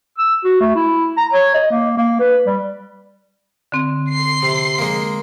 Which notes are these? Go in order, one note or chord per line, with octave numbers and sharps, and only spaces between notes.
E6
F#4
A3
E4
A#5
C#5
D#5
A#3
A#3
B4
G3
D3 C4
C6 C7
C3
G#3 A#3